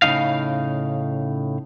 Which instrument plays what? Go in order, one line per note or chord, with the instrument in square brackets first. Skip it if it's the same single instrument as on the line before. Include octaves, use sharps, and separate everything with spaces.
[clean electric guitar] A2 C#3 F3 D#4 F5